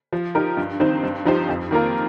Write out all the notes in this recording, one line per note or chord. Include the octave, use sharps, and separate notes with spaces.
F3
D#4 G4 A#4
G2
D#3 C4 D#4 C5
G2
F3 D#4 G4 C5
F2
D#3 A#3 F4 A#4